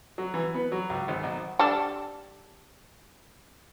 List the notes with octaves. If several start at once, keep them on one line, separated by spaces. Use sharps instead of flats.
F#3
E3
B3
F#3
C#2
G#1
B1
G3 D4 A4